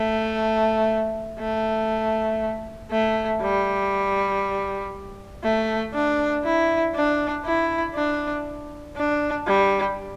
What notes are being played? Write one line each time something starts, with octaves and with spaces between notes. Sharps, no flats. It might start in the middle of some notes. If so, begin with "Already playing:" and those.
Already playing: A3
A3
A3
G3
A3
D4
E4
D4
E4
D4
D4
G3